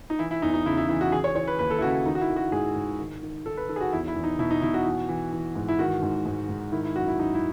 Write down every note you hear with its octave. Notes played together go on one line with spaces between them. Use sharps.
D#4
E3 E4
E4
E2 D#4
D#4
C#3 E4
E4
E3 E4
F#4
E3 G#4
C#5
E3 C#5
B4
D#2 B4
A4
E4
C#3 F#4
D#3 D#4
F#4
E4
D#3
F#4
G#2 G#4
G#2
D#3
D#3
D#3 A4
B4
D#3 A4
G#4
F#4
E2 E4
E4
E2
D#4
B2 E4
D#4
B2 E4
F#4
E3
E3
E3
G#2
E4
D#3 F#4
G#2
G#2
G#2
D#3 E4
E4
F#2 F#4
E4
F#2 D#4
E4